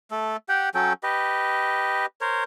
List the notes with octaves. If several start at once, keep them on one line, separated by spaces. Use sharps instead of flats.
A3 A4
G4 F#5 G5
F#3 C#4 A4 G5
G4 B4 D#5
A#4 C5 C#5